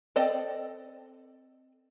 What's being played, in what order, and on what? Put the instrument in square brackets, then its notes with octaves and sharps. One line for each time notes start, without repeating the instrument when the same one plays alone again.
[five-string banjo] C4 A4 D5 D#5